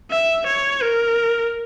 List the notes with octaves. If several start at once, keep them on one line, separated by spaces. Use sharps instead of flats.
E5
C#5
A#4